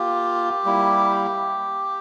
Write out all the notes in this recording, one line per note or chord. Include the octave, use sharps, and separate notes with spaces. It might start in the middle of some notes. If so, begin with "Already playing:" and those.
Already playing: A#3 F4 G4
G3 A#3 E4